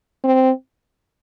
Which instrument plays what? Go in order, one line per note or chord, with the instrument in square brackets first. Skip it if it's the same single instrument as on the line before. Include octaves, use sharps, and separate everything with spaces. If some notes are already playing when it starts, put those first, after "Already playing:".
[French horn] C4